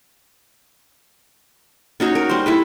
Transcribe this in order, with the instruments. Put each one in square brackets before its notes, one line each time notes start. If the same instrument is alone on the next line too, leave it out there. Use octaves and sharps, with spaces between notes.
[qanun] C#4 D#4 F#4 C#5
A#4
G3 C5
E4 A4 B4